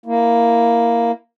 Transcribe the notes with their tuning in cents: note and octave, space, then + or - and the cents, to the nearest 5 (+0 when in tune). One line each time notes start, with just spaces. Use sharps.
A#3 +0 E4 +0